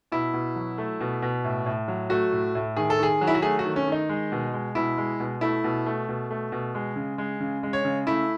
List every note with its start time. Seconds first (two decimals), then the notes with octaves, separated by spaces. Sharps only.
0.12 B2 E4
0.34 B2
0.56 F#3
0.78 A3
1.01 B2
1.22 B2
1.44 A2
1.66 A2
1.88 F#3
2.10 A3 F#4
2.32 A2
2.55 A2
2.77 D#3 G#4
2.90 A4
2.99 D#3 G#4
3.21 F#3
3.27 E4
3.35 F#4
3.42 A3 G#4
3.59 F#4
3.65 D#3
3.76 C#4
3.87 D#3
3.92 D#4
4.09 G#3
4.32 B2
4.54 G#3
4.75 B2 E4
4.98 G#3
5.20 B2
5.41 A3 E4
5.64 B2
5.86 A3
6.09 B2
6.31 A3
6.52 B2
6.75 G#3
6.96 C#3
7.18 G#3
7.40 C#3
7.63 G#3
7.73 C#5
7.85 C#3
8.07 A3 E4